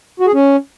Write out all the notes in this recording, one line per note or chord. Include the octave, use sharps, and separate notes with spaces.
F#4
G#4
C#4